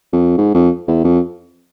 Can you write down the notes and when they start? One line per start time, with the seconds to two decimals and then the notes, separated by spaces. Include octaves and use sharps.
0.13 F2
0.38 G#2
0.55 F2
0.88 E2
1.04 F2